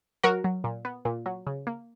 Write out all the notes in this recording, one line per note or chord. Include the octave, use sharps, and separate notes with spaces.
F#3 F#4 A#4
F#3
A#2
B3
A#2
F#3
C#3
A#3